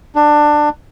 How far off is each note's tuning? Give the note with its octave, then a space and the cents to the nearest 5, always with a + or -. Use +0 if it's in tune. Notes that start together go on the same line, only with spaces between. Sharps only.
D4 +20